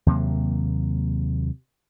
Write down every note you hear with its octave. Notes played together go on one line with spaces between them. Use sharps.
D#2 C3 F#3 A#3